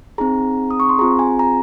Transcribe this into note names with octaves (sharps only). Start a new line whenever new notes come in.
C4 D#4 G#4 A#5
D#6
C#6
C6
C4 F4 G#4 A#5
G#5
A#5